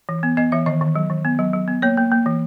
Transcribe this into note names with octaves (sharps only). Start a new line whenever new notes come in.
E3
B3
B3 D#5
E3 E5
D#3 D#5
D#3
F#3
D#3
B3
F#3
F#3
B3
A#3 C#5
A#3
A#3
E3